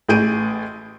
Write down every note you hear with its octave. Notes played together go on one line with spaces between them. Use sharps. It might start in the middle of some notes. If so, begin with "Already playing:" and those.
A1 A2 G#4 G6 D7 D#7